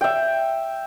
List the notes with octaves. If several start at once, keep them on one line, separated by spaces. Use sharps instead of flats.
E5 G5